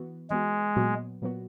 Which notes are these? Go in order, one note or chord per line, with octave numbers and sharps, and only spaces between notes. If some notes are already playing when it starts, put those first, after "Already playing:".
Already playing: E3 B3 F#4
E3 G#3 B3 F#4
A#2 F#3 B3 F#4
A#2 F#3 B3 F#4